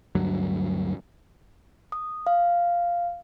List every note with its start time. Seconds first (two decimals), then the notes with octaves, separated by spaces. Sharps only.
0.15 D2 G2 F#3
1.92 D#6
2.27 F5